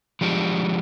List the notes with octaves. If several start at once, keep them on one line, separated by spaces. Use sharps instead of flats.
F3 G#3 D4 G4